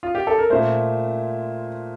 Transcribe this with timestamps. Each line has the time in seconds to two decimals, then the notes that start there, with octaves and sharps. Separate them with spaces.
0.03 F4
0.15 G4
0.27 A4
0.38 A#4
0.50 A#2 A3 C5